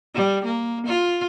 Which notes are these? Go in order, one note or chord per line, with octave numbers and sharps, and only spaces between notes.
G3
A#3
F4